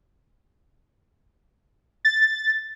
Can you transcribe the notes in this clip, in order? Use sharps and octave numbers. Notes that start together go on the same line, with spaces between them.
A6